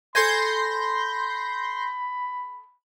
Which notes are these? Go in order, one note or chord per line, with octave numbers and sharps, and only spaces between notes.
A4 C5 G#5 B5 C6 G6 A#6